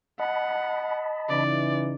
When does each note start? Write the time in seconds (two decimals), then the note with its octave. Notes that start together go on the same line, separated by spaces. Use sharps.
0.20 D#5 F#5 A5 B5
1.29 C#3 E3 D#4 D5